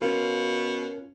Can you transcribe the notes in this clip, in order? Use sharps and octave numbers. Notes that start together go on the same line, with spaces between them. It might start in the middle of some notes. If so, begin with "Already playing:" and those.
B2 C#4 F4 A#4